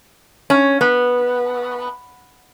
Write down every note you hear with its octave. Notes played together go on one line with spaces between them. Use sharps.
C#4
B3